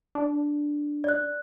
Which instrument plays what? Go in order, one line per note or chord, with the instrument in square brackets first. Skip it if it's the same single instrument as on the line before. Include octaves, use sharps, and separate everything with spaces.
[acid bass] D4
[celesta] D5 F#6